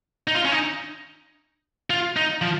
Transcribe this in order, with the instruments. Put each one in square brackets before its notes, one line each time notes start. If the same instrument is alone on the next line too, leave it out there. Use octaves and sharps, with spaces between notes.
[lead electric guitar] D#4
F4
C#4
D#4
F4
D#4
F3